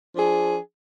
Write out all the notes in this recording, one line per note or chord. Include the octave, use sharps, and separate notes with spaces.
F3 D4 G#4